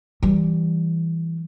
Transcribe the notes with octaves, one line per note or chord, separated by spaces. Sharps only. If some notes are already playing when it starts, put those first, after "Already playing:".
E3 G3